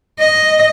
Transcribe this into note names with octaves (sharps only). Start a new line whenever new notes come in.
D#5